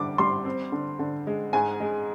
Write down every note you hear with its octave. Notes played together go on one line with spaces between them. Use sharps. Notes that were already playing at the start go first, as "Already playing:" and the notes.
Already playing: D3 G3 D6
G3 C6
C4
D3
D3
G#3
G#2 G#5
G#3